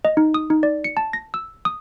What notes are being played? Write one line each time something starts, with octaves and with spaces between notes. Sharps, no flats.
D#5
D#4
D#6
D#4
D5
C#7
A5
A#6
E6
D#6